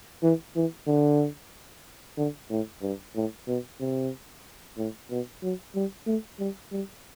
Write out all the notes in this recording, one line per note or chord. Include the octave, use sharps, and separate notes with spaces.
E3
E3
D3
D3
A2
G2
A2
B2
C3
A2
B2
F#3
G3
A3
G3
G3